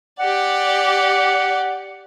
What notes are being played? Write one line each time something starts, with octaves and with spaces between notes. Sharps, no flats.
G4 D5 F#5